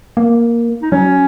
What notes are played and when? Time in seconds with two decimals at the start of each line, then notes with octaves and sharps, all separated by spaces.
0.17 A#3
0.82 D#4
0.91 F#3 C#4